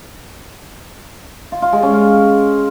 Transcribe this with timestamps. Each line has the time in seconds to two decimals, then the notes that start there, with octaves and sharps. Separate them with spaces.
1.52 F4
1.62 F4
1.72 G#3
1.83 C#4
1.93 F4